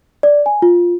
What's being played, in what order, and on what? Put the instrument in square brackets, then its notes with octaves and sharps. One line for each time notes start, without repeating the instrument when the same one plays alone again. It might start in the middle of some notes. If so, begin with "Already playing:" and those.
[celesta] D5
G#5
F4